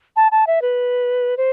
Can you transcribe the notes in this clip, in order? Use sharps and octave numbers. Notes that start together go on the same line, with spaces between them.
A5
A5
E5
B4
C5